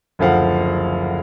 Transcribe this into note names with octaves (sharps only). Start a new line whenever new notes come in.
F#1 D2 F3 F5 F#5